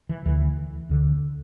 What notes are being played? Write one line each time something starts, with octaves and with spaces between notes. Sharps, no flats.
E3
D2 D3 E3
D2 D3